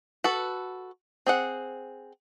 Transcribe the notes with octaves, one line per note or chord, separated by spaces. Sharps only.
F#4 A4 B4
C4 G#4 F#5